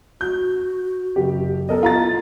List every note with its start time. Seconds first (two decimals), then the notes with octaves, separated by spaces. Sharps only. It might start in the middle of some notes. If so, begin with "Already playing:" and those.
0.21 F#4 G6
1.16 F#1 G4
1.69 B3 A4 A#4 D#5
1.83 F4 A#5 A6